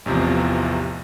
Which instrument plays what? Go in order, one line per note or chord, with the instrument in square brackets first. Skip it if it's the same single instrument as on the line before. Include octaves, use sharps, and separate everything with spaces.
[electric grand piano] A1 E2 C3 F3